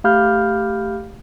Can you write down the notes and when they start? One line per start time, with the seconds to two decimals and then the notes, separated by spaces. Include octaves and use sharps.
0.04 A3 G4 F5 B5 F6 G6